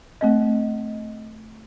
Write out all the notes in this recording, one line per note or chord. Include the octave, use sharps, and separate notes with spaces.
A3 C4 D#5